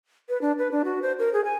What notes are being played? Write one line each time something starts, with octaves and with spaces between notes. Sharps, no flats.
B4
D4
B4
D4
F#4
C5
A#4
G#4
G#5